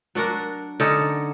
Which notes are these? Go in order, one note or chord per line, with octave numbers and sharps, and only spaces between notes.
F#3 D4 F#4 A#4
D3 C#4 D#4 A4